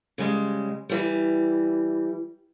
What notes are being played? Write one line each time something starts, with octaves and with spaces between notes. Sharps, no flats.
C#3 G3 G#3
E3 G3